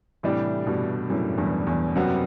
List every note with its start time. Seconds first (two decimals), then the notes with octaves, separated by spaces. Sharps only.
0.23 A2 C3 E3 G3 D4
0.66 G2 B2
1.09 F#2 A2
1.38 E2 G2
1.67 E2
1.95 F#2 C3 G3 B3 F#4